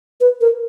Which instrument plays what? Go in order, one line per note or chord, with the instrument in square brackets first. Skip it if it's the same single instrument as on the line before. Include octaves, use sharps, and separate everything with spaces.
[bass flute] B4
A#4